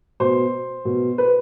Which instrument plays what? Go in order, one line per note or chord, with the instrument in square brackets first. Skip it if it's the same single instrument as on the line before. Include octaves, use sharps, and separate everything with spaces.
[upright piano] B2 C5
B2
B4